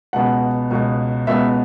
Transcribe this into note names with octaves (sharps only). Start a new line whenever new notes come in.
C#2 B2 B3 F#5
C#2 B2 B3
C#2 B2 B3 E5